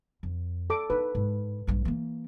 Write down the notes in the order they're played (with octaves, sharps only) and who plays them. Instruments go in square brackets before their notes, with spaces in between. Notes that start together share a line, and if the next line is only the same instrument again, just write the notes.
[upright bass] F2
[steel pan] A4 D6
[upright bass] D#4 [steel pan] B4
[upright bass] G#2
A#1 G2
E3 A#3